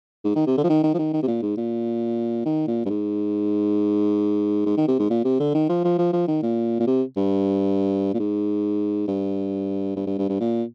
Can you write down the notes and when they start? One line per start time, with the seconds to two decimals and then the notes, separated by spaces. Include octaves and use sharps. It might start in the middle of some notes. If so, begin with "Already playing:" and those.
0.24 G#2
0.36 D#3
0.46 C3
0.58 D3
0.64 F3
0.69 D#3
0.84 D#3
0.94 F3
0.99 D#3
1.13 D#3
1.23 C3
1.28 A#2
1.43 G#2
1.57 A#2
2.45 D#3
2.67 A#2
2.85 G2
2.90 G#2
4.66 G#2
4.77 D#3
4.88 C3
4.99 G#2
5.10 A#2
5.25 C3
5.40 D3
5.55 D#3
5.69 F3
5.84 F3
5.99 F3
6.13 F3
6.28 D#3
6.43 A#2
6.80 A#2
6.87 C3
7.16 G2
8.14 A#2
8.19 G#2
9.08 G2
9.96 G2
10.07 G2
10.18 G2
10.29 G2
10.40 A#2